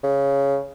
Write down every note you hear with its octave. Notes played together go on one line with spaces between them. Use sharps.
C#3